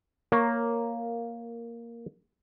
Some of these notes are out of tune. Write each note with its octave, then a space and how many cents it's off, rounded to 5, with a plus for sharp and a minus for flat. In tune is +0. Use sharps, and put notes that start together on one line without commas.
A#3 +0 A#4 -5 C#5 +0